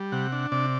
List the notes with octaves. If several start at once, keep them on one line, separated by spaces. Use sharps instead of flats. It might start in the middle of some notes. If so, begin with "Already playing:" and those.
Already playing: G3
C3 F#5
D4
C3 D5